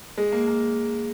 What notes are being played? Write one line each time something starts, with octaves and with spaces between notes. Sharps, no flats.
G#3
A#3
A#3